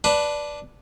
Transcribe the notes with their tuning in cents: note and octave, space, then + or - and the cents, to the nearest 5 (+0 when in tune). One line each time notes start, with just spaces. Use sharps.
D4 +0 B4 +0